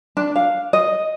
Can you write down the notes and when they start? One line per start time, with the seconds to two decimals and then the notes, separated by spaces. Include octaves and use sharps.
0.17 D4
0.36 F5
0.73 D#5